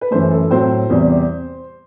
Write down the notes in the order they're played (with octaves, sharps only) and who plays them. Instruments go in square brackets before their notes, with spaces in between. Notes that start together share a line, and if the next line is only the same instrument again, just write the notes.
[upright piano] B4
F#2 E3 A3 C5
A4
A2 F#3 C4 C5
E2 C3 G3